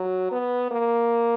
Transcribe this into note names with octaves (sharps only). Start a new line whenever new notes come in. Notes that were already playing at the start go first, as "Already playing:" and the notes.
Already playing: F#3
B3
A#3